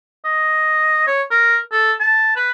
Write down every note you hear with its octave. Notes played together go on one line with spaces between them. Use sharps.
D#5
C#5
A#4
A4
A5
B4